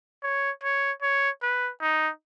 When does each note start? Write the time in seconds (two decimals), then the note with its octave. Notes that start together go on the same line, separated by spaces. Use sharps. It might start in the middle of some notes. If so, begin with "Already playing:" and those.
0.23 C#5
0.63 C#5
1.02 C#5
1.43 B4
1.82 D#4